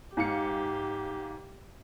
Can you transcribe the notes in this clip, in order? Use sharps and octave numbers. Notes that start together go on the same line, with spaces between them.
G#2 G4 F5 C#7